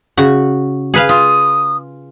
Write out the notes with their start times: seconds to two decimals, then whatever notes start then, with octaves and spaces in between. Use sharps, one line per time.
0.17 C#3 F#4
0.94 G#4 B4 F5
1.09 F4 D#6